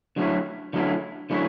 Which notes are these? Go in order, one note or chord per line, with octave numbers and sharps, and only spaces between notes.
D3 F#3 A3 C#4 E4
D3 F#3 A3 C#4 E4
D3 F#3 A3 C#4 E4